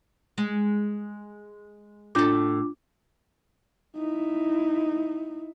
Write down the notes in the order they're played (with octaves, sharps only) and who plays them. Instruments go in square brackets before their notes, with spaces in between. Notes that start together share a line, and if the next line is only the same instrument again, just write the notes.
[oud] G#3
[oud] A2 A4 [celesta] D4 F4 D6
[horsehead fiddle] D#4 E4